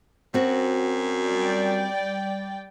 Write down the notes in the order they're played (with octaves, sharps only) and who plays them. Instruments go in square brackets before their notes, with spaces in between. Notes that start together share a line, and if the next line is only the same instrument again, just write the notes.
[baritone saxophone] F#2 [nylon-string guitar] C4 F#4
[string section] G3 D5 G5